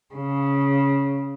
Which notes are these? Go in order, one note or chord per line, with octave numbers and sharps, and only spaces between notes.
C#3